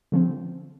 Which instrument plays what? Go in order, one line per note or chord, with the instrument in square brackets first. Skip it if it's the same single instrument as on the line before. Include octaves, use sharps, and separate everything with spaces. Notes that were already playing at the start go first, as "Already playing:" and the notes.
[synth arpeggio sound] D3 F3 C4